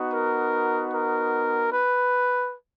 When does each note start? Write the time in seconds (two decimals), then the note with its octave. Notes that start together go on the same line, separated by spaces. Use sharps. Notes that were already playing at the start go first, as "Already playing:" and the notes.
Already playing: B3 D#4 F#4
0.11 A#4
0.90 A#4
1.69 B4